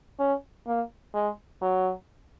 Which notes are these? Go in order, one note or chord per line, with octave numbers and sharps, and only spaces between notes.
C#4
A#3
G#3
F#3